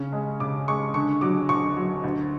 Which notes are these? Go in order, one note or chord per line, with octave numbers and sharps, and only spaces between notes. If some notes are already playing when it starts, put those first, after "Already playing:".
Already playing: C#3 C#4
G#3
C#3 D6
G#3 C#6
D3 C#6
F#3 D6
D2 C#6
F#3
D2